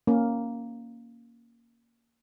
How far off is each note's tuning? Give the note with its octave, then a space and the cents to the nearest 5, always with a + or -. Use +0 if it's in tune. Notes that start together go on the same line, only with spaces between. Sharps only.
A#3 +0 C#4 +0